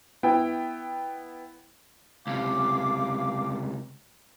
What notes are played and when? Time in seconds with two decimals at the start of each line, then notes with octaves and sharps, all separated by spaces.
0.23 B3 E4 G5
2.27 C#2 C3 F5 D6